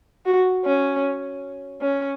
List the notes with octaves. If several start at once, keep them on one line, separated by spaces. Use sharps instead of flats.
F#4
C#4
C#4